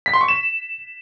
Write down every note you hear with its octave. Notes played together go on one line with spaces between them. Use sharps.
B6
C6
C#6
E7